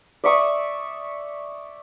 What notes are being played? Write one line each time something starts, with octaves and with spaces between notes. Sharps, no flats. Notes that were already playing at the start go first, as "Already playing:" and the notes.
D5 E5 C#6 D#6